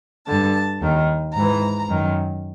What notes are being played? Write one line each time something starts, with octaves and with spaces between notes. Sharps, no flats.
G2 D3 A5
D#2 D#3
G#2 E3 A#5
F#2 D#3